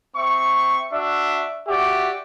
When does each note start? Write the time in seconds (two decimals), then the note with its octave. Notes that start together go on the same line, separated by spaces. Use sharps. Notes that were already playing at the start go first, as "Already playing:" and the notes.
0.17 C4 E5 C#6
0.93 D4 F#4 E5
1.68 F#4 G4 D5 E5